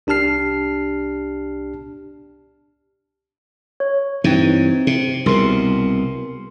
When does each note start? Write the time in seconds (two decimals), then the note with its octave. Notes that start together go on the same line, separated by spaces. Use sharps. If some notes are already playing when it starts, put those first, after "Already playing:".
0.07 C2 D4 G4 A5 F6 C7
3.80 C#5
4.24 G2 E3 C4 D#4
4.87 C3
5.26 C2 B2 G#4 A#4 C6